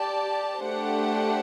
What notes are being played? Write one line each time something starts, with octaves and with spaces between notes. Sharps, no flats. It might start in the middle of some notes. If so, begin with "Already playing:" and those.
Already playing: G4 D5 A5
A3 D4 G4 C5 F#5